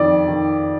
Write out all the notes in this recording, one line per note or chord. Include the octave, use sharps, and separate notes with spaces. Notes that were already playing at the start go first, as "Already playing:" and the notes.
Already playing: F2 D#3 D5
D#3